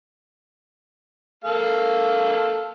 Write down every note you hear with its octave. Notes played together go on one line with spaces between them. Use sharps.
A#3 A4 F5